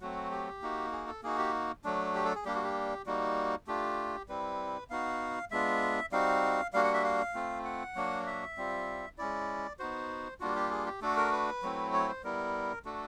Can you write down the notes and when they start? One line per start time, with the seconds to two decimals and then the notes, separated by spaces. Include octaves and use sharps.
0.01 F#3 A3 C4 F#4
0.31 G4
0.62 A#3 D#4 F#4
0.92 G#4
1.07 A4
1.23 A#3 D#4 F#4 G#4
1.38 G4
1.84 F#3 A3 D4
2.15 G4
2.25 A4
2.35 G#4
2.45 G3 A#3 D4 G4
2.55 F#4
2.64 G4
3.06 G3 A#3 D#4 F#4
3.67 A3 D4 F4 G4
4.29 G3 C4 E4 B4
4.90 B3 D#4 F#4 F5
5.51 G#3 B3 D4 F4 E5
6.12 G3 C4 D#4 F#4 F5
6.73 G3 A#3 D4 F#4 F5
6.83 F#5
6.94 E5
7.04 F5
7.34 A3 C4 F4
7.65 F#5
7.96 F#3 A#3 D4 F#4
8.26 E5
8.57 G3 C4 F4
9.18 G#3 C#4 E4 D5
9.79 B3 D#4 F#4 C5
10.40 G3 A#3 D4 F4 F#4
10.56 G4
10.71 G#4
10.86 G4
11.01 A3 D4 F#4 A4
11.17 A#4
11.32 B4
11.62 F#3 A3 C4 E4
11.93 C#5
12.08 C5
12.24 G3 B3 E4 A#4
12.85 A3 D4 F#4 A4